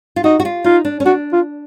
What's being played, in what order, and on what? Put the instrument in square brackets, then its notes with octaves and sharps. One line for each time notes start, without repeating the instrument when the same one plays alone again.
[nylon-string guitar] F4
[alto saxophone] D#4 [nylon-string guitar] F#4
[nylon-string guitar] F#4
F4
[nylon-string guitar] D#4 [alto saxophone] F4
[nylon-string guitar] D4
C#4
[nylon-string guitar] D4 [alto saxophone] F#4
[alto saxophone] F4